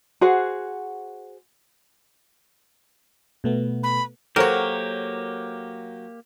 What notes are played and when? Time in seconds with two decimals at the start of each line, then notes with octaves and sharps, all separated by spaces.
0.21 F#4 G#4 C5 F#5
3.44 B2 A3 B3
3.83 B5
4.36 F#3 A#3 F#4 G4 A4 A#4 C5 C#5